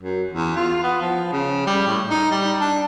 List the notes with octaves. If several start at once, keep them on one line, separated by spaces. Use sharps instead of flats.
F#2
E2
F4
B3
F3
C#3
G3
A2
D#4
G3
D4